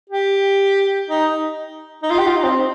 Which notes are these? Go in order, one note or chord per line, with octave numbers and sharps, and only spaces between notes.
G4
D#4
D#4
F4
G4
F4
D#4
C4